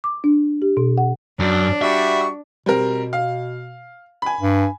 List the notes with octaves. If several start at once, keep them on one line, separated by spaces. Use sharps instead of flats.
D6
D4
G4
B2
F#5
F#2 D4
G3 F#4 E5 C#6
B2 G3 C4 A#4
F5
G#5 B5
G2